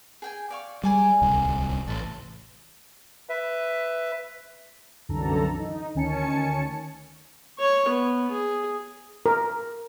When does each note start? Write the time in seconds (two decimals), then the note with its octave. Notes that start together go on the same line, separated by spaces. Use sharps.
0.22 G#4 G5 G#5
0.51 D5 F5 C#6
0.84 G3 G#4 G#5 D6
1.22 D1 C2
1.88 A1 A4 C6
3.29 B4 E5
5.09 C2 F#2 D3 E3 A4 A#5
5.59 D#4
5.95 D2 D#3 C#4 G#5 A5 C#7
7.58 C#5 C#6
7.88 B3
8.31 G#4
9.26 A#4